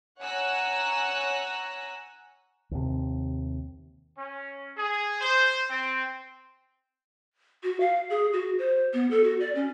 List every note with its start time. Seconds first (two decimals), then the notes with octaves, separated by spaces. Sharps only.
0.21 C#5 F#5 G#5 A#5 E6 F#6
2.71 D#2 C3
4.18 C#4
4.77 G#4
5.21 C5
5.70 C4
7.63 F#4
7.80 F5
8.10 G#4
8.33 F#4
8.58 C5
8.94 B3
9.11 A4
9.24 F#4
9.40 D5
9.55 C#4